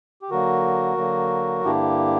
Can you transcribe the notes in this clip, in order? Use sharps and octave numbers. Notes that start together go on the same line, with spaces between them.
G4
D3 F#3 A#3 F#4 A#4
D3 F#3 A#3
G2 D3 A#3 D4 E4 G4